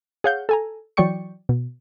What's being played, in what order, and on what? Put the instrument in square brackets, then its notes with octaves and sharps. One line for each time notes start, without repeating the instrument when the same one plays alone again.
[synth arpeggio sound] G#4 C#5 F5 F#5 G6
A4 G#5 A#5
E3 F#3 D5 G5 C#6 C#7
B2